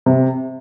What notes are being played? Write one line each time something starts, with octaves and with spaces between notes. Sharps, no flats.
C3